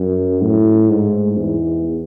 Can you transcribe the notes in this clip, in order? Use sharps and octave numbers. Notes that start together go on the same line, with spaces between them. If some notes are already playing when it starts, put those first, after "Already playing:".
Already playing: F#2
A2
G#2
E2